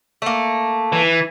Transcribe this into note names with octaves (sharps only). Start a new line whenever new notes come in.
A3 A#3
E3